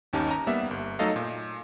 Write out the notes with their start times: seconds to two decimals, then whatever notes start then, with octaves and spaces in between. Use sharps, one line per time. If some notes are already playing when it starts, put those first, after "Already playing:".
0.13 G1 D#2 C#4 D#4 G4 A5
0.31 A#5
0.47 G3 A#3 B3 E5
0.71 G1
0.99 F#3 A3 D#4 A4 D#5 F5
1.16 A#2